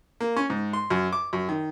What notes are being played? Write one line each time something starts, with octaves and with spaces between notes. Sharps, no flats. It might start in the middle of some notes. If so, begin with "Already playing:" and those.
A#3
C#4
G#2
C6
F#2
D6
F#2
D#3